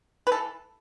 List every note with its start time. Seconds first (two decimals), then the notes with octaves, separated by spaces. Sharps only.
0.27 B4
0.32 E3 A4